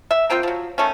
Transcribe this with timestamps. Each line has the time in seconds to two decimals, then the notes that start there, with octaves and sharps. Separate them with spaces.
0.11 E5
0.30 A#3 C4 F4 G5
0.43 F3 F#3
0.78 D#3 A3 C#4